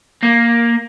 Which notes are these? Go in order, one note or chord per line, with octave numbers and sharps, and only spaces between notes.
A#3